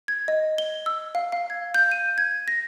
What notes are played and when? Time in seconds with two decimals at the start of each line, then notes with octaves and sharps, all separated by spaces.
0.08 G#6
0.28 D#5
0.58 G7
0.86 E6
1.15 F5
1.32 F5
1.50 G#6
1.74 G6
1.92 D#7
2.18 G#6
2.48 A#6